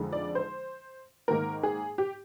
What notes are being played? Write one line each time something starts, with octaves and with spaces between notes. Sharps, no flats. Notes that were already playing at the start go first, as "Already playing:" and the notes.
Already playing: F2 D3 G#3 D#4
D5
C5
G#2 D#3 A#3 D#4 A#4
G#4
G4